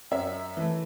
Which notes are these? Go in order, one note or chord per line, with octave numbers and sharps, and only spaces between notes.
F#2 E5
E3 A3